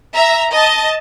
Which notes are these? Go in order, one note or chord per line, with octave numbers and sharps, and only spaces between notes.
E5 A#5
D#5 A5